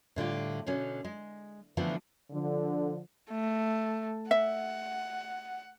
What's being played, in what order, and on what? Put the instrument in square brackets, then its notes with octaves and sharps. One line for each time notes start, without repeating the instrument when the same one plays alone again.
[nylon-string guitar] A2 D3 G3 F4
B2 D3 C#4
G#3
D3 E3 F3 A3 B3
[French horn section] D3 F3
[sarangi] A3
[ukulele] E5 [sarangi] F#5